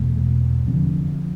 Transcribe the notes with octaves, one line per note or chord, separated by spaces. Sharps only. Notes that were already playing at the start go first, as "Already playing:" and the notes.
Already playing: E2 B2 A3
F1 F2 D3